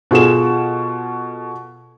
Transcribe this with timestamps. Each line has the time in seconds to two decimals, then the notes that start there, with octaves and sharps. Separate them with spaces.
0.11 B2 F4 G#4 A4 E7